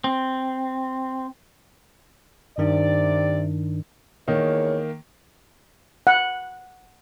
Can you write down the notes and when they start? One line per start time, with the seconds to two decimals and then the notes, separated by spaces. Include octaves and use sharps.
0.04 C4
2.58 G2 C3 D#3 D4 D5
4.28 E2 D#3 A#3 C#5
6.07 F#5